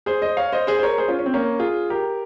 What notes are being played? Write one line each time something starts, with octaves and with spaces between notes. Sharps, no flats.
G#4 C5
C5 D#5
C#5 F5
C5 D#5
G#4 C5
C5
A#4 C#5
G#4 C5
C#4 F4
C#4
C4
A#3 C#4
F4 G#4
G4 A#4